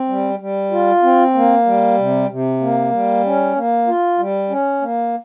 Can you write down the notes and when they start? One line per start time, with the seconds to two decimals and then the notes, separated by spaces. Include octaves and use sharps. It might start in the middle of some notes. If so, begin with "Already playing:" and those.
Already playing: C4
0.09 G3
0.39 G3
0.72 F4
1.03 C4
1.34 A#3
1.66 G3
1.97 C3
2.29 C3
2.61 A#3
2.92 G3
3.24 C#4
3.56 A#3
3.87 F4
4.18 G3
4.50 C#4
4.81 A#3